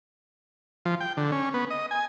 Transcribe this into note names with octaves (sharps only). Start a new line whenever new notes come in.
F3
G5
D3
C#4
B3
D#5
G#5